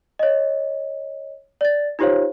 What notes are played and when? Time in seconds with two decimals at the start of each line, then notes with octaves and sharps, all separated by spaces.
0.19 C#5 D#5
1.61 D5 A6
1.99 D#4 F4 G4 C5 C#5 F5